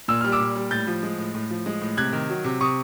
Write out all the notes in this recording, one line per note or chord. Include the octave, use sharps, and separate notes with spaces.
A#2 E6
G3 F6
D6 E6
A#2
G3
A2 G6 A6
F3
G#3
A2
A2
F3
G#3
A2
C3 F#6 G#6
D#3
F#3
C3
C3 C#6 D#6